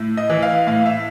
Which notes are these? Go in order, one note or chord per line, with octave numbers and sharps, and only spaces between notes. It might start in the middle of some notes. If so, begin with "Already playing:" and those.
Already playing: A2
D#5
E3
F5
A2 F5
E5